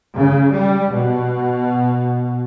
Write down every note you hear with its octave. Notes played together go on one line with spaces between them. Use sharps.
C#3
G3
B2